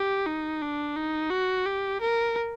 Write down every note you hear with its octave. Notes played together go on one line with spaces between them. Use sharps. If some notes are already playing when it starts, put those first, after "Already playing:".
Already playing: G4
D#4
D4
D#4
F#4
G4
A#4